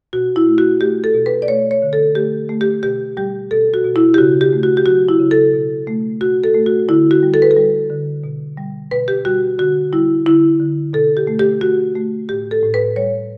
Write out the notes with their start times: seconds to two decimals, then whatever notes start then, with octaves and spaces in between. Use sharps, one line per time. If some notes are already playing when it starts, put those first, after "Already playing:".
0.13 B2 F#4
0.36 E4
0.46 A3
0.58 F#4
0.80 A3 G4
1.04 A4
1.14 B2
1.26 B4
1.42 D5
1.48 A3 C#5
1.71 C#5
1.82 D3
1.93 A4
2.15 A3 G4
2.49 A3
2.61 G4
2.83 B2 G4
3.17 G3 G4
3.51 B2 A4
3.74 F#4
3.84 B2
3.96 E4
4.14 G4
4.18 C#3 F#4
4.41 G4
4.53 A3
4.63 F#4
4.77 G4
4.86 F#3 F#4
5.09 E4
5.20 C#3
5.31 A4
5.53 B2
5.87 A3
6.21 B2 F#4
6.44 A4
6.54 A3
6.66 F#4
6.88 D3 E4
7.11 F#4
7.23 G3
7.34 A4
7.42 B4
7.51 A4
7.56 G3
7.90 D3
8.24 B2
8.57 G3
8.91 B2 B4
9.08 G4
9.25 G3 F#4
9.58 D3 F#4
9.93 G3 E4
10.26 D3 E4
10.60 D3
10.93 B2 A4
11.17 G4
11.27 A3
11.39 G4
11.61 A3 F#4
11.95 A3
12.29 A2 G4
12.51 A4
12.63 A2
12.74 B4
12.96 G3 C#5